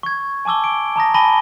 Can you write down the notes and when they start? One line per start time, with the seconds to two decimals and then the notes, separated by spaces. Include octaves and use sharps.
0.03 C#6 G#6
0.45 G#5 A5 D6 E6 G7
0.64 D7
0.96 A5 A#5 D#6 A#6
1.14 G#5 A5 B5 A#6 D#7 G7